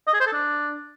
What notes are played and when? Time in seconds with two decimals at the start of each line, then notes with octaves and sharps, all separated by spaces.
0.07 D#5
0.14 G#4
0.20 C5
0.27 A4
0.33 D4